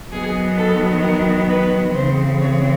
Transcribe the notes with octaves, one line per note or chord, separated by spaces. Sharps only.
D#3 F#3 B3 G#4
A4
A#4
B4
C#3 E3 A3 C4 C5
C#5